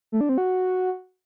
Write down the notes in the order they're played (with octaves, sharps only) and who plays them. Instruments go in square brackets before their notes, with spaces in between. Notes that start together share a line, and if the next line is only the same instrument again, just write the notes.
[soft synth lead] A3
D4
C4
F#4